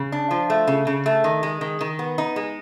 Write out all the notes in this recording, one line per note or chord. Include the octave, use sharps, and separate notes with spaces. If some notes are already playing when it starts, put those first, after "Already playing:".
Already playing: C#3
D4
F3
A3
C#3
C#3
A3
D#3
G#3
D#3
D#3
B3
D#4
G#3